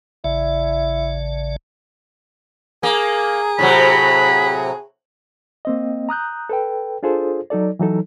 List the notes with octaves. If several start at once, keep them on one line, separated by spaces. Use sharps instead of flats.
A1 C#3 E4 D5
A#3 G#4
A2 C3 F#3 B5
A#3 C4 D#5
A#5 D#6 F#6 G6
A4 B4 G5
D4 F4 G#4 A4 C5
F#3 D#4 A4 D5
E3 F#3 D#4 A4